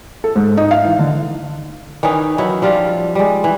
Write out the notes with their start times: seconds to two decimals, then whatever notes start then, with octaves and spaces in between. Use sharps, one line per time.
0.24 A4
0.36 G#2
0.57 D#4
0.71 F5
0.85 E3
0.99 D3
2.03 D#3 E3 C#4 D#4
2.38 D#3 F#3 E4
2.62 F3 G3 F4 F5
3.15 G3 G#3
3.44 E3